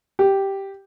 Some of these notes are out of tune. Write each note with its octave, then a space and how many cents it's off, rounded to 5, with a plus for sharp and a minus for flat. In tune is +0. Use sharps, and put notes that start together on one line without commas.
G4 -5